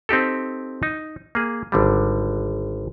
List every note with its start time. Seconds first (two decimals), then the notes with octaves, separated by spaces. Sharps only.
0.09 C4 D#4 G4 A4
0.83 D#4
1.35 A#3 G#4
1.72 G#1 D3 G3